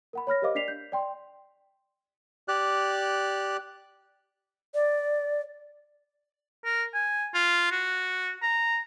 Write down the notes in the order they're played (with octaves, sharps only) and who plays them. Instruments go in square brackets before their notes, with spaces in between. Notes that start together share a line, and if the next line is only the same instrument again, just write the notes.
[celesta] A#4 F#5 B5
C#5 B5 F6 A#6
G4 A#4 C5 D#5 F5 D6
D4 D5 B6 C7 F7
G6
D5 G5 C6
[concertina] G4 D5 F#6
[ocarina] D5
[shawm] A#4
G#5
F4
F#4
A#5